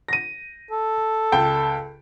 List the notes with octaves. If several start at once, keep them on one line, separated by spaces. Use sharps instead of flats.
A#6 D#7
A4
C#2 G5 A5